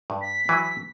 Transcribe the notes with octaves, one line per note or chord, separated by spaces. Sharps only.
G2
B6
E3 F#3